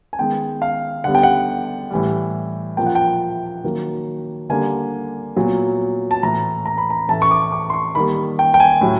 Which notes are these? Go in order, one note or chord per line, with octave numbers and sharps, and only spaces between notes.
G#5
D#3 G#3 B3 G5
F5
D3 G3 B3 F#5
G5
F#5
A2 E3 G3
A#2 F3 A#3 G5
F#5
G5
D#3 F#3 A#3
D3 G3 A#3 G#5
A#2 F#3 B3
A5
A2 E3 A3 A#5
A#5
B5
A#5
A2 E3 A3 A5
C#6
D6
D6
C6
C#6
D#3 G3 A#3 B5
G5
G5
G#5
A2 F#3